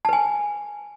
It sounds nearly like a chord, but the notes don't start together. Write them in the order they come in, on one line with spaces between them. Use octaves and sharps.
A5 B4 G#5